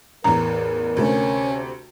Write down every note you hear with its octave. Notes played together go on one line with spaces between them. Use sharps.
A1 E2 A#4 A#5
D2 C3 A3 C#4